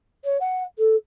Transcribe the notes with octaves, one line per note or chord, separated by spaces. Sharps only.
C#5
F#5
A4